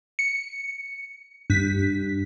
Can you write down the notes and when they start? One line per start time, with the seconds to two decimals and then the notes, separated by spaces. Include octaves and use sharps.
0.19 C#7
1.50 G2 B6